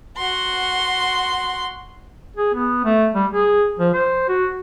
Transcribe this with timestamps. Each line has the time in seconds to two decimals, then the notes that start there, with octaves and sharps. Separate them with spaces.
0.18 F#4 C6
2.36 G#4
2.54 B3
2.85 A3
3.14 G3
3.33 G#4
3.79 F3
3.94 C5
4.28 F#4